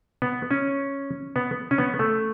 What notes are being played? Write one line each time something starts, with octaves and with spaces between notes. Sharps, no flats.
B3
C#4
B3
C#4
B3
A3